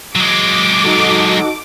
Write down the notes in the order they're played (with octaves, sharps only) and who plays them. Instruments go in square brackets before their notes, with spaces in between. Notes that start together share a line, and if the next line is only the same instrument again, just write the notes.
[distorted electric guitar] F#3 G#3 [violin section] D6
[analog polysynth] D#4 F#4 A4